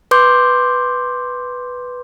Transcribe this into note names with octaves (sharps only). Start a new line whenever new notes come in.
B4 C6 D6 G6